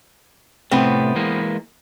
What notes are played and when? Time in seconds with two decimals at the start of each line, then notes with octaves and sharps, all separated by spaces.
0.71 A2 C3 A3 B3 C4
1.16 E3 G#3 A#3